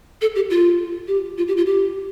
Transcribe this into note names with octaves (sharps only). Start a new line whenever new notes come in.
A4
G4
F4
G4
F4
G4
F4
G4